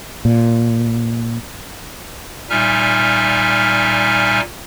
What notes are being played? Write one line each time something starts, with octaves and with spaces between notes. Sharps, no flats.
A#2
A#2 G3 D#4 E5 G#5 F6